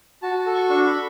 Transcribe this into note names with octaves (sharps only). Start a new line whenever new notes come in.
F#4 A5
A5
A4
C#6
D4 C#6
B5